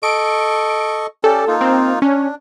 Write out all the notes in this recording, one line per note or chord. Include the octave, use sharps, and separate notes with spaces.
A4 D#5 C#6 D7
C#4 G4 A4 D5
A#3 D#4 F4
C4
C#4 D4